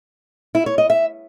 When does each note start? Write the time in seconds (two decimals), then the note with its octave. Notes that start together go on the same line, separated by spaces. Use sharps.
0.55 E4
0.66 C#5
0.78 D#5
0.90 E5